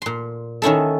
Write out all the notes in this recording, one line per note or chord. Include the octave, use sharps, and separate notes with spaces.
A#2 C6
D#3 C#4 E4 A4